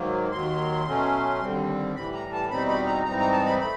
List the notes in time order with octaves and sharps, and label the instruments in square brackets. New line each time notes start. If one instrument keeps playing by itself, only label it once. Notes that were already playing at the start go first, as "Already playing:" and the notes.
Already playing: [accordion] G#2 D#3 F#3 A#3
D#2 D#3 F#3 C6
B2 F#3 A3 C#4
D#2 D3 G3 C4
A2 E3 G3 B5
A#5
A5
E2 B2 G3 C4 D#4 B5
B5
A#5
G#2 E3 G3 C4 D#4 A#5
A#5
A5
B5
A3 B5